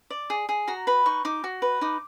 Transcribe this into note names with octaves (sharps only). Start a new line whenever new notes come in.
D5
G#4
G#4
F#4 A#5
B4 B5
D#4 C#6
D#4 D6
F#4
B4
D#4 D6